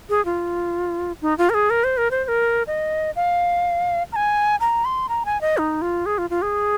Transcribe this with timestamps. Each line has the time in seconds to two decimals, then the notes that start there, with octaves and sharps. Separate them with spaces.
0.09 G#4
0.25 F4
1.22 D#4
1.38 F4
1.50 A#4
1.54 G#4
1.70 A#4
1.84 C5
1.97 A#4
2.11 C5
2.25 C5
2.28 A#4
2.67 D#5
3.16 F5
4.12 A#5
4.16 G#5
4.60 A#5
4.85 C6
5.09 A#5
5.25 G#5
5.41 D#5
5.58 D#4
5.82 F4
6.06 G#4
6.18 F4
6.30 F4
6.42 G#4